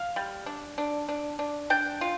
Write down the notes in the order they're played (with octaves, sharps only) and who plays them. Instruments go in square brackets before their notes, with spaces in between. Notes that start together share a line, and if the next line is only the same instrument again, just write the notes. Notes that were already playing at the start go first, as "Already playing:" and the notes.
Already playing: [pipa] F5
G3
D4
D4
D4
D4
D4 G5
F4